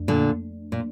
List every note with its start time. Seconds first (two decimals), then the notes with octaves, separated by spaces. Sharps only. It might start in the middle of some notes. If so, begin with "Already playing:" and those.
Already playing: F2 A3 D4
0.08 A#2 D3
0.72 A#2